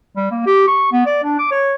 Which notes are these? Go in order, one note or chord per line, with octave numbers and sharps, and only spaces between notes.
G3
A#3
G4
C#6
B3
D5
D4
D6
C#5